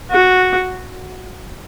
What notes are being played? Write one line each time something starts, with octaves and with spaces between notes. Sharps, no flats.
F#4